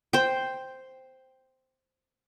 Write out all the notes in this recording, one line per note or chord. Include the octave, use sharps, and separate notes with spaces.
C5 G5